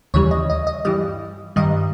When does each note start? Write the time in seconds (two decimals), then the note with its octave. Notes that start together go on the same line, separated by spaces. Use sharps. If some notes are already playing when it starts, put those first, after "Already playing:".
0.14 D#2 C#3 E3 G3 C#5
0.31 D#5
0.50 D#5
0.67 D#5
0.85 G2 E3 G3 D#5
1.56 G2 D#3 G3 D#5